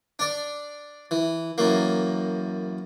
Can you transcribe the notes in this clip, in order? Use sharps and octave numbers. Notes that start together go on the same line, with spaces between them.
D4 D5
E3
F#2 E3 A#3